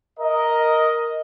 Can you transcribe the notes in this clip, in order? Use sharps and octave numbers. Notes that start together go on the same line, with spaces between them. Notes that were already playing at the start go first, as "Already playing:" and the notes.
A#4 D#5